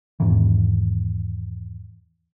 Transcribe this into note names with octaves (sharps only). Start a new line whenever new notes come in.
E2 G#2 D#3 E3